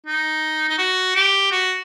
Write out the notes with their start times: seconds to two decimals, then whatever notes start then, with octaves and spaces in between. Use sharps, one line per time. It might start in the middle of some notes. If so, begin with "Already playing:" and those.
0.06 D#4
0.69 D#4
0.78 F#4
1.16 G4
1.51 F#4